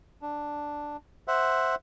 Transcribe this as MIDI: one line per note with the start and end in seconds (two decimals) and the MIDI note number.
0.22 0.97 62
1.28 1.75 72
1.28 1.75 76
1.28 1.75 78